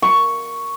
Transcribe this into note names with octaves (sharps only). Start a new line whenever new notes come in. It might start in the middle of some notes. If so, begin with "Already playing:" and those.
C#6